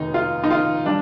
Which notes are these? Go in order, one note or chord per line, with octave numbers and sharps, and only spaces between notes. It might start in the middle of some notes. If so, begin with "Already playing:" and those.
Already playing: F1 D#2 D#3 D#4
F4
D#4
F4
G3 D4